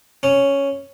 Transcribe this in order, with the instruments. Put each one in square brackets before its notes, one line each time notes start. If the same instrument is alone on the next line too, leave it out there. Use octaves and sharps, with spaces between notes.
[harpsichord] C#4